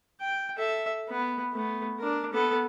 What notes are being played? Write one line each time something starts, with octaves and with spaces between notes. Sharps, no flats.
G5
A4 E5
B3
A3 B3
D4 A#4
B3 A4